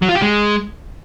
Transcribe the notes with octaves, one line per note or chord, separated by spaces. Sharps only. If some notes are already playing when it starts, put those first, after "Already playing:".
F#3
F4
G4
G#3